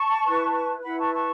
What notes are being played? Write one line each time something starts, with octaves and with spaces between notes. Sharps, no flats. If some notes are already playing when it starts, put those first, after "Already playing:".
Already playing: A5 C#6
E4 B4
E4 B4 F#5 B5
A5 C#6
A5 C#6